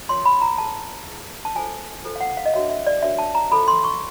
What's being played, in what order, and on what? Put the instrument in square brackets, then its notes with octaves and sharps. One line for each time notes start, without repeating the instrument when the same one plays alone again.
[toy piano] F4 A#4 C#5 C6
B5
A#5
E4 G#4 B4 A5
E4 G#4 B4
A5
F4 A4 C5 G#5
F4 A4 C5
F5
F#5
F5
D#5
D4 F#4 A#4 C#5 E5
E5
D5
D4 F#4 A#4 C#5 E5
A5
A#5
F4 A4 C5 B5
C6
C#6